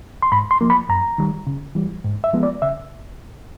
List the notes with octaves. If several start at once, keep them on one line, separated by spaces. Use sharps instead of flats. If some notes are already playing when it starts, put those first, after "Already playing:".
C6
G#2 B5
C6
F3 A#3
B5
F#2 A#5
D#3 G3
C#3
E3 G3
G#2
E5
F3 G#3 B3
D5
C#3 E5